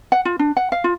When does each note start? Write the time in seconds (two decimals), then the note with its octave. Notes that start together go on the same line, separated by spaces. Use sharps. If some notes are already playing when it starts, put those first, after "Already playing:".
0.12 F#5
0.25 F4
0.39 D4
0.57 F#5
0.72 F5
0.84 F4